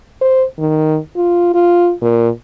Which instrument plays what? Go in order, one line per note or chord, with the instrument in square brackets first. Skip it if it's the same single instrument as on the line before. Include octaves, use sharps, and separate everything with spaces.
[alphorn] C5
D#3
F4
F4
A#2